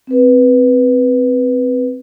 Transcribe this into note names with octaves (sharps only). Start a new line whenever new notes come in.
C4 B4